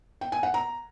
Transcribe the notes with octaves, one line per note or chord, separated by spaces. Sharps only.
G5
G#5
F#5
A#5